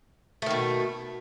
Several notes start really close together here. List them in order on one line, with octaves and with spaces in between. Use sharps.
A3 D#3 B2